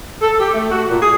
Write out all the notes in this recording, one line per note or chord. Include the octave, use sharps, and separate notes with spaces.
A4
G4
A3
F#4
A#2
G#4